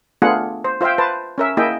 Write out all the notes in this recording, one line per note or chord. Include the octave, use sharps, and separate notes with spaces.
A3 B3 D4 F4 G#4 F#5
C5
F4 C5 E5 F5 G5
B4 C5 A5
C#4 A#4 E5
A#3 E4 G#4 D#5 E5 G5